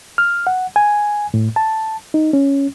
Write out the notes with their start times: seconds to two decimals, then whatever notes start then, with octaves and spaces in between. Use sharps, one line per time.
0.18 F6
0.47 F#5
0.76 G#5
1.34 A2
1.56 A5
2.14 D#4
2.33 C#4